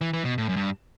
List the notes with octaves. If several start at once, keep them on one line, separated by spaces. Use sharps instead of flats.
E3
E3
B2
A2
F#2
G2